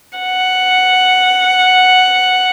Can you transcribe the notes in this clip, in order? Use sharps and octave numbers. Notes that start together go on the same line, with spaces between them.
F#5